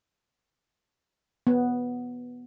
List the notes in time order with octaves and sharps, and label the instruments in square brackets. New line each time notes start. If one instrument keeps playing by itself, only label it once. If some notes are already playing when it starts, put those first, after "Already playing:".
[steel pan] B3